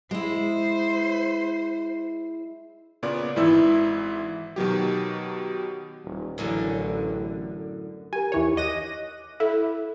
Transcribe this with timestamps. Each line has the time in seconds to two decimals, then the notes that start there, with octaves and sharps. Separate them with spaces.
0.11 G#3 E4 C5
3.03 A#2 C#3 B3 D5 D6
3.36 G#1 G#2 E3 E4 E5 E6
4.56 B2 D#3 F#3 G4
6.04 D#1
6.38 A1 F#2 A2 D3
8.13 G4 A#4 G#5
8.32 D#2 E3 C#5
8.57 D#5 D6 F#6 A#6 D#7
9.40 E4 A4